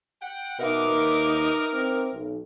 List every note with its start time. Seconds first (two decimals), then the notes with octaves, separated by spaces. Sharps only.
0.21 F#5 G5
0.59 B2 D#4 A#4 B4 E5 F#5 D6
0.89 D#2
1.73 C4
2.13 B1